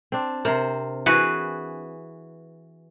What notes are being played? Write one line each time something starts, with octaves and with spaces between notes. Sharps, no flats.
C4 D4
C3 A#4 C5
E3 F#4 G#4 B4